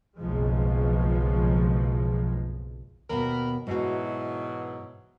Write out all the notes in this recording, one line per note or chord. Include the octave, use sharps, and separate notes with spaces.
F#1 B1 C#3 F3 G#3
D#2 B2 A#4 B5
G#2 B2 E3 F#3 F#4